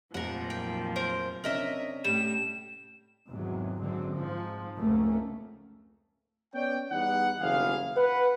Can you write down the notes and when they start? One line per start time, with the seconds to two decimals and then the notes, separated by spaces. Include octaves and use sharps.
0.14 F1 F#2 A#2 F3 A#4 F#5
0.50 G5
0.96 A#4 C5
1.44 C3 C#4 D4 A#4 D#5 E5
2.04 A2 G3 E7
3.29 G#1 E2 G#2 C3 F#3
3.81 F#2 D3 G#3 C4
4.17 G#2 F3
4.78 F1 C#2 A3 A#3 C#4
6.54 B3 C#4 C#5 D5 G5
6.91 E2 G3 B3 D#4 F#5
7.41 F#1 B1 G2 E3 G#4 F5
7.97 B4 F#5